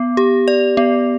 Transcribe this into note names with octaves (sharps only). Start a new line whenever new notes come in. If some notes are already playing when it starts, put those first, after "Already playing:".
Already playing: B3
G4
D5
B3